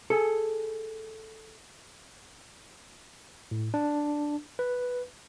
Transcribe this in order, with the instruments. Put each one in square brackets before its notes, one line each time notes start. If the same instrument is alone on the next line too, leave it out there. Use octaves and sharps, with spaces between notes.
[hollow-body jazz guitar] G#4 A4
[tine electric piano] A2
D4
B4